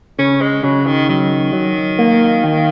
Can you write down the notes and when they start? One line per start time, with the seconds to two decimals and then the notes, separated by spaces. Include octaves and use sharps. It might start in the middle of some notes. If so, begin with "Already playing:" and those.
0.19 C#3 C#4
0.41 G#3
0.63 C#3 F#3
0.86 D#3
1.09 D#3 F#3
1.53 F#3
1.99 A#3
2.44 D#2